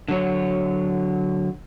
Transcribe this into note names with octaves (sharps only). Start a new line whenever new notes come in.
D3 F#3 C#5